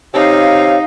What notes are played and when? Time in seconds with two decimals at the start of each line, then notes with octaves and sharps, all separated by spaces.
0.14 C3 D#4 C#5 F5